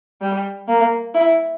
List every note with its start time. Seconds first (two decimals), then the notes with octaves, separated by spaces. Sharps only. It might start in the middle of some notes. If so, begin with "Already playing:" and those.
0.21 G3
0.68 A#3
1.14 E4